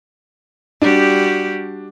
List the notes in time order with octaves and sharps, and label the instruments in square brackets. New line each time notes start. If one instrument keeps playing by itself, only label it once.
[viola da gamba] G3 F#4 G4 [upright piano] D4